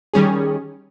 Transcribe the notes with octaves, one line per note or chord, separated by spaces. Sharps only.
D#3 G3 C#4 G#4